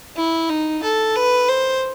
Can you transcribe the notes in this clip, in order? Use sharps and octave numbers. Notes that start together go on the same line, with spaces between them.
E4
D#4
A4
B4
C5